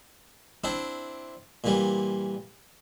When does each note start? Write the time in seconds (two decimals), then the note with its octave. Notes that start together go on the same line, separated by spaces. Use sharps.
0.64 C4 D4 E4
1.64 A#2 E3 G3